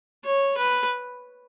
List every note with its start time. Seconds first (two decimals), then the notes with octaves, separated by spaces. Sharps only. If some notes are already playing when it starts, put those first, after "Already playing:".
0.25 C#5
0.58 B4